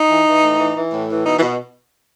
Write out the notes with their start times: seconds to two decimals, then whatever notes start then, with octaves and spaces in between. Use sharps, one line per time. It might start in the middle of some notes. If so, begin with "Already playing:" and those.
Already playing: D#4
0.10 E3
0.27 E3
0.43 A2
0.59 E3
0.76 E3
0.92 A2
1.10 E3
1.26 B2 D#4
1.38 E3
1.42 B2